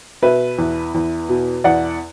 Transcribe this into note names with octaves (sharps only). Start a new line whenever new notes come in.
B2 B4 E5
E2
E2
B2
E2 D5 F#5